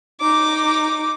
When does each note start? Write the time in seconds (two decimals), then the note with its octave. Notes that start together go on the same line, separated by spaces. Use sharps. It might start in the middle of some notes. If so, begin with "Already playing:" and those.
0.21 D#4 D6